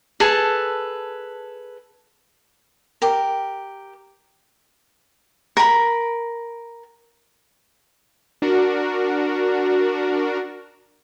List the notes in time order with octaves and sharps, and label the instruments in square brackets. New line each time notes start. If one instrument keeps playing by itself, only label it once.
[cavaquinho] G#4 A4 B4 A5
G4 A#4
A#4 B5
[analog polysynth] D4 F#4 A#4